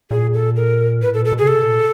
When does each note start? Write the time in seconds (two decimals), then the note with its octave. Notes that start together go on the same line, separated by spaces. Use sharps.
0.11 A#2 G#4
0.34 A4
0.56 A#4
1.02 A2 B4
1.14 A4
1.17 A#2
1.25 A4
1.32 B2
1.38 C#3 G#4
1.48 C3 A4
1.63 A#2